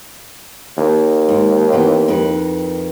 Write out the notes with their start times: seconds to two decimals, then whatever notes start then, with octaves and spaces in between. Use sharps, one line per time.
0.78 D#2
1.29 G#2
1.72 E3 B3 C4
2.08 F2 D#3 B4